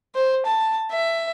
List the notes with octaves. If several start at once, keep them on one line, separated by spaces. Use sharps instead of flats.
C5
A5
E5